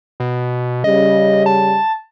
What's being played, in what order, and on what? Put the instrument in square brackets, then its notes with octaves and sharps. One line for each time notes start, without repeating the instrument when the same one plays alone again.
[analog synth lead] B2
[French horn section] C#3 G3 [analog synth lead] D#5
[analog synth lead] A5